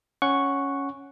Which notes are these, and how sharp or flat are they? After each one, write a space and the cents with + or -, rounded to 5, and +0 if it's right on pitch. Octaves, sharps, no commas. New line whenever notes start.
C#4 +0 F#5 +0 C#6 +0